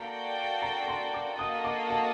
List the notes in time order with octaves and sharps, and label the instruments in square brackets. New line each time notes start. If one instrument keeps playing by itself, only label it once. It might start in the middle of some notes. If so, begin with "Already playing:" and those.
Already playing: [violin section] A#3 F#4 A4 D5 G5 [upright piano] A#5
[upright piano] A#5
C6
D6
[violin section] A#3 F#4 A4 D#5 [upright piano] D#6
[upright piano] D6
A5